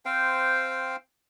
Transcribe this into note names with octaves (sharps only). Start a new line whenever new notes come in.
C4 C5 F5 G5